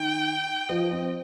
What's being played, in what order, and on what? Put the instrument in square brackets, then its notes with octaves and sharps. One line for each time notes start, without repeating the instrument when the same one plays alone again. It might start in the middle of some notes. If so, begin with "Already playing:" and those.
Already playing: [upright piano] D#3 [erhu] G5
[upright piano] F3 [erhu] D#5
[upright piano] C4